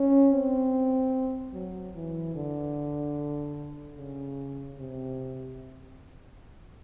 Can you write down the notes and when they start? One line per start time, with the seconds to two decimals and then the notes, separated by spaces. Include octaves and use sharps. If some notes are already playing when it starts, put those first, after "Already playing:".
Already playing: C#4
0.32 C4
1.53 F#3
1.95 E3
2.35 D3
3.97 C#3
4.79 C3